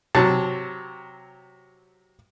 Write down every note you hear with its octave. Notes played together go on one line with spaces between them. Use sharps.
C3 F#3 A5